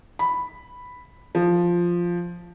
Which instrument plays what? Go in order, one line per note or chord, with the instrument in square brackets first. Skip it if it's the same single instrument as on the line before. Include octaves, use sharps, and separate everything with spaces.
[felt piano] B5
F3